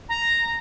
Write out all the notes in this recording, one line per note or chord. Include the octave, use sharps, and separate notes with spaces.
A#5